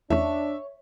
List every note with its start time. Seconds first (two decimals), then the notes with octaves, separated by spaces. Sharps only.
0.10 E2 A3 C#4 D4 C#5 E5